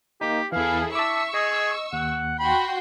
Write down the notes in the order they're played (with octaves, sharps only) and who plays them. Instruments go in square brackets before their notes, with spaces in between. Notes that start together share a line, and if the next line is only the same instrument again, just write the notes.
[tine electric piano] A#3 D#4 [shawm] G4
[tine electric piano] E2 E3 [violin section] E4 G#4 A4 [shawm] F5
[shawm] E5 [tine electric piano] A5 D6 [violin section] C#6 E6
[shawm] G#4 [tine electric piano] D#5
[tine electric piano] D#2 [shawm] F#5
[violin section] F#4 G5 C6 [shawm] B5